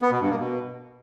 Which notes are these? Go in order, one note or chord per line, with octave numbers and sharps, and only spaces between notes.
B3
B2
G2
A#3
B2